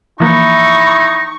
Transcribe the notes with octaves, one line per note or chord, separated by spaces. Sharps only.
E3 F3 A#3 D#4 E4 C#6